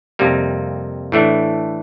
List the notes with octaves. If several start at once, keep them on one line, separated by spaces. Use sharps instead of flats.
F2 C3 G3 A#3
A2 E3 A3 D4